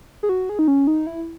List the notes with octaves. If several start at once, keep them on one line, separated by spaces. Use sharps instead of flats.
G#4
F#4
G#4
D#4
C#4
D#4
E4